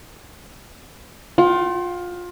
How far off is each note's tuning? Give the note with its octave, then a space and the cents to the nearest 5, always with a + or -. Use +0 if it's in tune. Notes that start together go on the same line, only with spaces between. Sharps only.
F4 +20 G5 -40